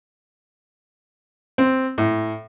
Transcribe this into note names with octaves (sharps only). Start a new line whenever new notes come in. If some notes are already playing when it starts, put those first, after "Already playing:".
C4
A2